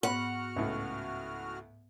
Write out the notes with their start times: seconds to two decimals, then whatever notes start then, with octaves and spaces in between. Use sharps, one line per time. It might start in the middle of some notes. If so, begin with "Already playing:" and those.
0.03 G#2 B3 F#4 F#5 B5 F6
0.56 C#2 A2